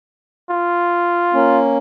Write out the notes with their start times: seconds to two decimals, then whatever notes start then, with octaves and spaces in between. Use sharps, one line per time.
0.50 F4
1.34 A#3 C#4